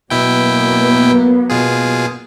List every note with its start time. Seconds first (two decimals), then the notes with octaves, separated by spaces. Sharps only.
0.10 B2 F#3 A#3 B3 E4 G5
1.50 B2 F4 G#4